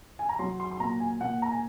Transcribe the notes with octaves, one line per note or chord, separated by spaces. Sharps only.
G#5
A#5
F#3 C6
C6
C6
A#2 A#5
G#5
A#2 F#5
A#5
G#5